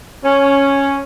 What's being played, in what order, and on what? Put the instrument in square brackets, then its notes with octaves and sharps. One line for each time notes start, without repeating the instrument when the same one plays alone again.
[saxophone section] C#4